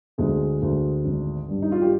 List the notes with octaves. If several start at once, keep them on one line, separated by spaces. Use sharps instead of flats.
D2 G#3 G#4
D2
G#1
G2
D#4
F4
G4